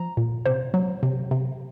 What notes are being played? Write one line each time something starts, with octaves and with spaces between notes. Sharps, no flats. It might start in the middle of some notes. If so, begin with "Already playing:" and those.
Already playing: F3 A#5
A#2
C3 C5
F#3
C3
C3